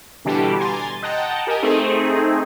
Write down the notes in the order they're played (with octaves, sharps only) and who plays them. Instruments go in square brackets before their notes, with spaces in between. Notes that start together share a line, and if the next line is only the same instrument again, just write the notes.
[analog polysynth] B2 D3 E3 G3 D4 G4
G#5 A#5 C6 A6
D#5 F#5 G5 A5 A#5
G4 A#4 D#5 G#5
A3 C4 D#4 G#4